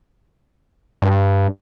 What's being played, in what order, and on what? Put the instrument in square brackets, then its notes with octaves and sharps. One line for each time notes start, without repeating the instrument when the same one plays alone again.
[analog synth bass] G2